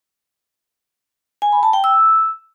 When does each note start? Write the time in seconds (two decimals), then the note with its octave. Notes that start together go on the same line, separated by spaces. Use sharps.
1.42 G#5
1.52 B5
1.63 A5
1.73 G5
1.84 E6